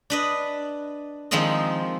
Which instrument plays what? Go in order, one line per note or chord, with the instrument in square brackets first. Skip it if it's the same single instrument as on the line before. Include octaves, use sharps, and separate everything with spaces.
[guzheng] D4 B4 D#5
D#3 F3 G#3 C4 F4 D#5